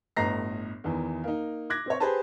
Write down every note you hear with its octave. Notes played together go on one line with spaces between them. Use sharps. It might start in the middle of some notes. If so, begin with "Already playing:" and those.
G1 A2 D#5 A#5 A#6 C7
E2 D#3 E3
A#3 D#4
D6 F#6 G#6 A#6
C4 C#5
G4 G#4 B4 C5 A5